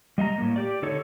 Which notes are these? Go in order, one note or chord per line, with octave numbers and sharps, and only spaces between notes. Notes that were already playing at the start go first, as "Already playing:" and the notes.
G3 D#5 F5 A#5
A2 A#3
G4 D5
D3 D#4 A4 C#5